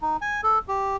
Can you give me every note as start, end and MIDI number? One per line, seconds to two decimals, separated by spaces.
0.02 0.17 63
0.22 0.41 80
0.43 0.59 69
0.68 0.96 67